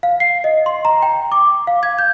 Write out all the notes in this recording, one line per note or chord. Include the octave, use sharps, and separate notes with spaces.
F5
C7
D#5
C6
A#5
G5
D6
F5
G#6
G6